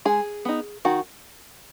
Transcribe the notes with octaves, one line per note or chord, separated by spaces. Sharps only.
G#3 G#4
B3 D#4
D#3 F#4